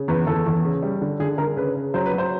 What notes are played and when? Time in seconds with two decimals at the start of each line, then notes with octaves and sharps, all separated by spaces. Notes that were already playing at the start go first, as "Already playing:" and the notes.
Already playing: C#3
0.08 E2 B4
0.27 E2 A4
0.46 E2
0.65 C#3
0.82 G3
1.02 D3
1.20 D3 G#4
1.38 D3 A#4
1.56 C#3 B4
1.76 C#3
1.94 F#3 C5
2.06 B4
2.13 F#3
2.18 C5